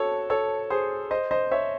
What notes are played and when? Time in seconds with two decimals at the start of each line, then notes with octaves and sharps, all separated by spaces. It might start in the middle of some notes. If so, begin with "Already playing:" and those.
Already playing: F#4 A4 C#5
0.30 A4 C#5
0.70 G#4 C5
1.11 C5 D#5
1.31 C5 D#5
1.51 C#5 E5